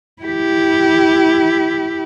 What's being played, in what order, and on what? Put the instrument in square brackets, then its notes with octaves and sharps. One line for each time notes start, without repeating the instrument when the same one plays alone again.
[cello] E4 G4